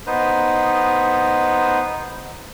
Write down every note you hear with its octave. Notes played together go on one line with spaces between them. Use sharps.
B3 D#4 B4 C5